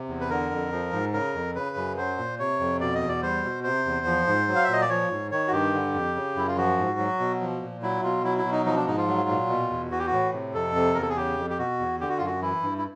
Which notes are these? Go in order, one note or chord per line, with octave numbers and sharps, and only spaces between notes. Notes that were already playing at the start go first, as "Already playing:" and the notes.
Already playing: C3
E2
B4
D3 A#4
F2
F3
G#2
C#3 A#4
F2
C#3 B4
F#2
F#3 C5
A#2
C3 C#5
F2
B2 D5
D#5
E2
D5
G3 C5
B2
C3 C5
E2
F3
G#2
F#3
F5
E5
A#2 D#5
D5
F3 C#5
G#2
D#3 C#5
F#4
G2 G4
D3
F2
C#3
F#2 E4
F4
F3 F#4
G#2
F#3
B2
F3
A#2
F#3 E4
B2 F4
F#3 E4
E4
B2
D#4
F3 D#4
D4
G#2 D#4
F4
F#3
A#2
B2
E2
E3 F#4
G4
F#4
A2
C3
F2 A4
C3
E2 A#4
A4
G#4
C#3 G4
F2
G4
B2 F#4
E2
D3 G4
F#4
F4
F#2 F#4
E3 E4
G2
E4